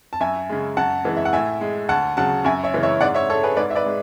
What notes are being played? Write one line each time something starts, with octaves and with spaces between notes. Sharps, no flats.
A5
F#2 E5 G#5
C#3 G#3
F#2 F#5 A5
E3 G#3
E5
F#5
A2 E5 G#5
G#3
D2 F#5 A5
C#3 F#3 F#5 A5
F#2 E5 G#5
C#5 E5
C#3 E3 G#3
C#5 E5
G#2 D5 F#5
C#5 E5
G#3 A4 C#5
G#4 B4
G#2 B4 D5
E5
B4 D5
G#3